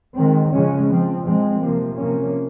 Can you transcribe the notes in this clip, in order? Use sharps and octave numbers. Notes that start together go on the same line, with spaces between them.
D#3 G#3 C4
C#3 F3 G#3 C#4
F3 C4
F3 G#3 C4
C3 F3 A#3
C3 F3 A#3 C#4